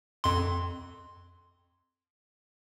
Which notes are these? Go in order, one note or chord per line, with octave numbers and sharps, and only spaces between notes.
F2 C6